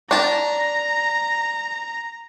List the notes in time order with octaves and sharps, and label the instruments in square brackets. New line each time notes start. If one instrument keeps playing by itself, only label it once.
[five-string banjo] D4 A5 [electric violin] A#5